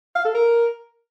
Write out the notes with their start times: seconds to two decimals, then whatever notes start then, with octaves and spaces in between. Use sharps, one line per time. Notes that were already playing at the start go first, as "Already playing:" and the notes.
0.15 F5
0.25 A4
0.34 A#4